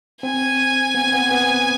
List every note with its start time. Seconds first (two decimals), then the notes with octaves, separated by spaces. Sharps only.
0.23 C4 G#5
0.95 B3
1.04 C4
1.13 B3
1.31 B3